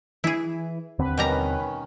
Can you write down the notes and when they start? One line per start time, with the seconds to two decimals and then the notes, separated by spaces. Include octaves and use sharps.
0.24 E3 E4 G#4
0.99 D#2 D3 C4 B4
1.18 B2 D#3 G3 C#4 A#5